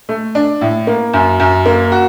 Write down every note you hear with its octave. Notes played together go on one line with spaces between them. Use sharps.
A3
D4
A2
A#3
F#2
F#2
A#3
F#4